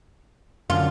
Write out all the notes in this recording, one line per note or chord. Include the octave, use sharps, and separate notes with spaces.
F#2 D3 F4